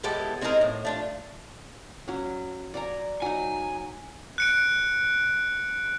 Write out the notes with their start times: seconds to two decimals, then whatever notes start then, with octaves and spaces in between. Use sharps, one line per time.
0.03 A2 G#3 B3 E4 G4 A4
0.41 G#3 C4 D#4 E4 G#4 A#4
0.61 A2
0.85 A3 D4 F4
2.08 F#3 C#4
2.74 D5 G#5 A#5
3.22 F#3 D#4 G#5
4.38 F#6 C#7 D7